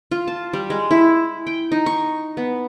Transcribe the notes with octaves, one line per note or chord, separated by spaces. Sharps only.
F4
A5
G3
G#3
E4
G5
D#4
C#6
B3